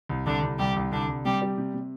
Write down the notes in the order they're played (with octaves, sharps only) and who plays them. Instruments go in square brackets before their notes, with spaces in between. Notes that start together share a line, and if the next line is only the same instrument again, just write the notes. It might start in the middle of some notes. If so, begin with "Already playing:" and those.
[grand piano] C2
[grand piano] C2 [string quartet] D3 D4
[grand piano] C2
[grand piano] C2 [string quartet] G3 G4
[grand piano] C2
[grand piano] C2 [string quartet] D3 D4
[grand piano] C2
[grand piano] C3 [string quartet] G3 G4
[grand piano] G3
C3
C3